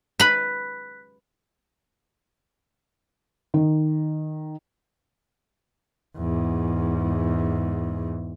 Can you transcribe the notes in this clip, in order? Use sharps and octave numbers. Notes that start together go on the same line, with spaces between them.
B4 B5 F#6 B6
D#3
E2 G#2